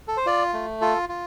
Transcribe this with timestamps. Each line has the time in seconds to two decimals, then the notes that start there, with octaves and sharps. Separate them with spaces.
0.08 A4
0.17 C5
0.26 F4 D5
0.54 A3
0.81 F4 A4
1.09 F4